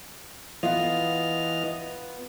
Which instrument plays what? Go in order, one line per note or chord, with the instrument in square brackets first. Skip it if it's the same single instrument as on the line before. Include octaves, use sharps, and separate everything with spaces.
[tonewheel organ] E3 D#5 F6 [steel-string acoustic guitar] B3 F4